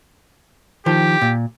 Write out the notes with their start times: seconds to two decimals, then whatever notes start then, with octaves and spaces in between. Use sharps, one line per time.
0.86 D#3 F3 G4
1.22 A#2